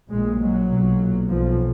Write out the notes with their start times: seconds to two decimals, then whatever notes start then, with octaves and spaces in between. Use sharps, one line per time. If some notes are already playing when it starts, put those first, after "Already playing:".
0.08 A#1 A#2 G#3
0.39 F#3
0.68 B1 A#2
1.28 B1 A#2 F3